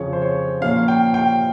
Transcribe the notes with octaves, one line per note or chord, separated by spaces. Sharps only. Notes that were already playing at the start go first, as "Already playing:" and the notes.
Already playing: F2 C#3 F3 C#5
C5
C#5
A#2 F3 A#3 C#4 F5
G5
G5